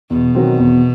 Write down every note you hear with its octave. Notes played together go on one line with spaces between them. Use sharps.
E2 B2
D#3 F#3 C4
E2